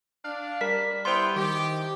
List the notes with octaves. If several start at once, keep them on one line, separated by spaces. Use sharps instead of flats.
D4 F5
G3 A#4 B6
B3 E4 C5 G5 C6
D#3 G4